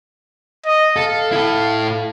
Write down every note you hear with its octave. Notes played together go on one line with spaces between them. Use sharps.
D#5
A4 F5
E4 A4